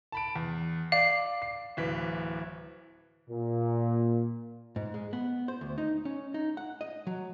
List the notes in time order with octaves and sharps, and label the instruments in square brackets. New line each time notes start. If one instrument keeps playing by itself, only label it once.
[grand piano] A5 B5 D7
E2
[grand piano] D5 [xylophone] F5
[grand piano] C7
D1 E3 B6
[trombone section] A#2
[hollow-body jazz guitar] G#2
G#3
B3
C5
D2
D#4
C#4
D#4
F#5
D#5
F#3